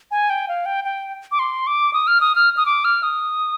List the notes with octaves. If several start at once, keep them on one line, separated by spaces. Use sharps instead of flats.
G#5
G5
F5
G5
G5
D6
C6
D6
D#6
F6
D#6
F6
D#6
D6
F6
D#6